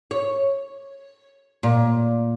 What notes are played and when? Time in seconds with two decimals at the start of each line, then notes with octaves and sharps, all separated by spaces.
0.11 C#5
1.63 A#2